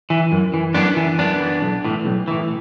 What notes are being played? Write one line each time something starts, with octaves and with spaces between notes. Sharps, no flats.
E3
F#2
E3
F#2 B3 D4
E3
F#2 B3 D4
E3
B1
A2 E3
B1
A2 E3